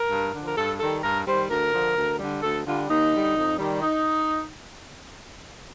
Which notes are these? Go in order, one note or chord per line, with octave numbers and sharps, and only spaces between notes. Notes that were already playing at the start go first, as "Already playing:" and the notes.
Already playing: A#4
G2
D3 F3
A#4
G2 A4
D#3 G3 A4
G2 A#4
D#3 G3 C5
D2 A#4
D3 F3
D2
D3 G3
D2 A4
D3 G3 F4
D#2 D#4
D3 G3
F2
D#3 G3
D#4